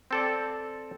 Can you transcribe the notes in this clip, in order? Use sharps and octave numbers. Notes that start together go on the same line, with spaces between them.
C4 A4 D5